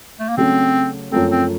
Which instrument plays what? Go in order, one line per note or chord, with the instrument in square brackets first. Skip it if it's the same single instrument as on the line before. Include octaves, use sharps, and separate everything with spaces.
[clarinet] A3
A#3
[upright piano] C#3 F#3 A3 C#4 F#4 [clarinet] C4
[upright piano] F#2 F3 A3 [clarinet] C4
[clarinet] C4